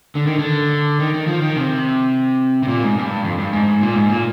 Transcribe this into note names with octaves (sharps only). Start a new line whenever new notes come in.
D3
D#3
D3
D#3
D#3
F3
D#3
C3
C3
A#2
G#2
G2
F2
G2
G#2
A#2
G#2
A#2